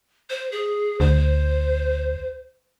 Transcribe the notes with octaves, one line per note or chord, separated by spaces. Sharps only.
C5
G#4
D2 C5